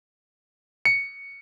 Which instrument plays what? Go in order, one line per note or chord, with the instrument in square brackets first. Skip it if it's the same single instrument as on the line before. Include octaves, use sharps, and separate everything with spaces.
[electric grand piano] C#7